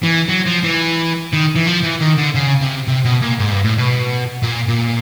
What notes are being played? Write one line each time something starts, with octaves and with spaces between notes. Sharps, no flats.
E3
F#3
F3
E3
D#3
E3
F3
E3
D#3
D3
C#3
C3
C3
B2
A#2
G#2
G2
A2
B2
A#2
A#2